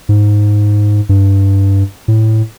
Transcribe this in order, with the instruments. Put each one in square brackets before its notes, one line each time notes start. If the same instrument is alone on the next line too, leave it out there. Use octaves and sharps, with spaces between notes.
[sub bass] G#2
G2
A2